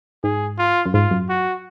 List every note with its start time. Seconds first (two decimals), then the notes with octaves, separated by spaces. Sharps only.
0.24 G#2 G#4
0.59 F4
0.86 F#2
0.94 G#2 F4
1.11 F#2
1.29 F#4